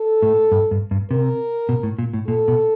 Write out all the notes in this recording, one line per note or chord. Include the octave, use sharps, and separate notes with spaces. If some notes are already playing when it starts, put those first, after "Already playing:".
Already playing: A4
A2
G2
G2
G2
C3 A#4
B2
A2
A#2
A2
A#2 A4
B2